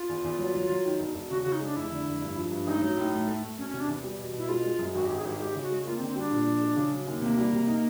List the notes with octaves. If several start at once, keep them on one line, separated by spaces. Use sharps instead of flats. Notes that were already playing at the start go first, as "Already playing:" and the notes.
Already playing: F4
E2
E2
F#3
F#3
F#3
D#3
E1
E1
C#3 F#4
F#4
C#3
D#4
G#3 D4
F1 E4
D3
F1
G2
F3
G2
A1 D#4
F#3
A2
A3
A3
A3
E1 C#4
C#4
C3
D4
E2
G3
B2
B2 E4
G#3 F4
G#3
F#2
G#1 F#4
G4
G#1
G#4
G#1 G4
G#3 G4
C#3
F#4
G#3
A#3 F4
C4
D3
C4
G3 D4
A#2
F3
G#3
C#3
F#3
D#2
C3 A#3
G3
C3
D#4